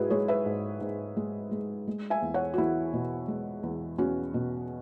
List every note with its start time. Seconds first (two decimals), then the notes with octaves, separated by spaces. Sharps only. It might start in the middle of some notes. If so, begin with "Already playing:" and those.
Already playing: G#2 G#3 E4 F#4 G#4 B4
0.10 G#3 G#4 C#5
0.28 B4 E5
0.46 G#2
0.81 G#2
1.17 G#3
1.51 G#3
1.87 G#3
2.10 E5 G#5
2.22 E2
2.34 C#5 F#5
2.54 F#4
2.58 E2 E4
2.93 B2
3.28 G#3
3.63 E2
3.98 E2 C#4 F#4
4.34 B2